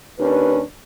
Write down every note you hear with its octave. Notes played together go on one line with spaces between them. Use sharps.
D#2 C#4 D4 B4